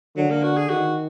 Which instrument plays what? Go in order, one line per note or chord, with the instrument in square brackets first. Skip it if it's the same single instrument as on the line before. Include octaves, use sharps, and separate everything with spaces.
[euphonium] D3 [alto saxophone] F#3
[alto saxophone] A#3
F#4
G#4
[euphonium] D#3 [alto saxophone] F#4